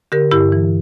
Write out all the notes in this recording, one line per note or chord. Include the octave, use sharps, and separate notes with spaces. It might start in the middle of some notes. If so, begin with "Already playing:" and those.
D3 G4 A#4
G2 E4 G4
E3